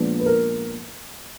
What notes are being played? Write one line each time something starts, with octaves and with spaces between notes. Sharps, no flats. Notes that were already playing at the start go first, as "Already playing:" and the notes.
Already playing: A#2 F3 G#3 B3 D4
B4
A#4